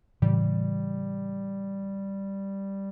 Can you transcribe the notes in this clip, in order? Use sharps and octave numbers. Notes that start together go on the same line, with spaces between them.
A2 C#3 E3 G3